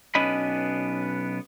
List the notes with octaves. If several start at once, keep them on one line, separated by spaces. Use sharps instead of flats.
B1 B3 C#4 D4 D#5 B5